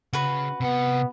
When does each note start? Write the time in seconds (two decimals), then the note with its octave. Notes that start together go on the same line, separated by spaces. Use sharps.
0.13 C#3 F#4 B4
0.61 C3 B3 F#5